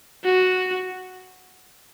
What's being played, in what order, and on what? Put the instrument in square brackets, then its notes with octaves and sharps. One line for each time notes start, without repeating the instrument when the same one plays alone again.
[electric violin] F#4